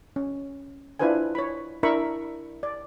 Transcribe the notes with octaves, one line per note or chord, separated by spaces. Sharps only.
C#4
D4 E4 F4 B4 C5 G#5
C#5 B5
D4 E4 A#4 E5 B5 C#6
D5